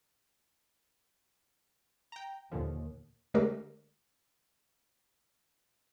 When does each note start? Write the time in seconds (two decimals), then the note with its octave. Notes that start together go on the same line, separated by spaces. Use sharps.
2.12 G5 A#5
2.52 D#2 A#2 D3 F3
3.34 D3 G#3 A3 G4 A#4